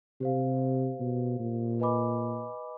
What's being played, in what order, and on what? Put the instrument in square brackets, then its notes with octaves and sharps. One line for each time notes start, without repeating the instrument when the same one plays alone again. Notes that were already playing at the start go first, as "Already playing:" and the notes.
[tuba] C3 [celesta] G4 C5 F5
[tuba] B2
A#2
[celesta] B4 D#5 G#5 B5 D6